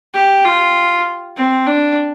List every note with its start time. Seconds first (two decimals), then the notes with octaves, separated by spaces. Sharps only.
0.13 G4
0.44 F4
1.36 C4
1.66 D4